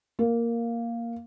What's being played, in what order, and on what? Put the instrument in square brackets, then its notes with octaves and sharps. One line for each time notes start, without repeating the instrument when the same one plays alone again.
[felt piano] A#3